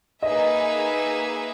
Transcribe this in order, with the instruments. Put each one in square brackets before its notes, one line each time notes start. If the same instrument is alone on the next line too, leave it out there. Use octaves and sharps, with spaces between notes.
[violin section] A#3 D#4 G#4 B4 E5 [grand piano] D#5